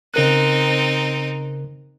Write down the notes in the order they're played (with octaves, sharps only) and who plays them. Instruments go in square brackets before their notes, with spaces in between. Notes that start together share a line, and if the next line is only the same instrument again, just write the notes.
[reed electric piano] C#3 A#4 F#6 [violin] C4 D#4